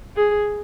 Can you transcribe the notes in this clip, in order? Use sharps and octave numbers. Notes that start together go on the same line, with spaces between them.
G#4